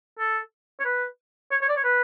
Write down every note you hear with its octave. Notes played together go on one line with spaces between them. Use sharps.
A4
C#5
B4
C#5
C#5
D5
C#5
B4